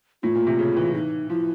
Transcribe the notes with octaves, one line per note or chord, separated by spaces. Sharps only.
A2 F4
A#2
C3
C#3
E3
D#4
F3 E4